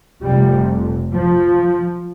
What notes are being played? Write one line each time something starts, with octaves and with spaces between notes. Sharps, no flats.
F1 F2 C3 G3
F3